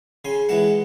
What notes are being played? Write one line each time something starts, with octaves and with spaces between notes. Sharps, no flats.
C#3 G#5 C6
E3 G#3 F#5 A5